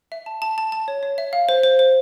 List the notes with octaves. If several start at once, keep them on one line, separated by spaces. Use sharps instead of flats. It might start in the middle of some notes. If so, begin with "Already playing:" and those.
E5
A5
A5
A5
A5
C#5
C#5
E5
F5
C5
C5
C5